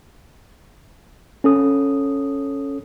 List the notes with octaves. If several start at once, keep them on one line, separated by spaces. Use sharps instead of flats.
C#4 A4 D#6